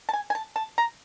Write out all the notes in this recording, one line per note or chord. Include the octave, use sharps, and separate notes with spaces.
A5
G#5
G#5
A5
A5
A#5